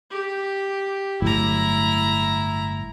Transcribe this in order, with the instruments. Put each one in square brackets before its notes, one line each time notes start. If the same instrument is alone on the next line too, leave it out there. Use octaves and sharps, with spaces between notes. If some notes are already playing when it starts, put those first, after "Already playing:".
[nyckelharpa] G4
[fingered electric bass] G1 A2 F#3 [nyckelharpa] E4 A#5